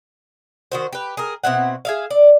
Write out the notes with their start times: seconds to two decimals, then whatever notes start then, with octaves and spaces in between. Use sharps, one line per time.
0.72 D#3 F#4 C5
0.93 G4 B4
1.17 G#4 A#4
1.44 B2 C4 E4 F#5
1.85 G#4 E5 F5
2.10 D5